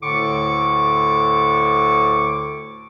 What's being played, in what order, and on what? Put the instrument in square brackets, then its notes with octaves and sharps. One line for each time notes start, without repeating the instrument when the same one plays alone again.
[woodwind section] D2 A2 D3 C#6 D6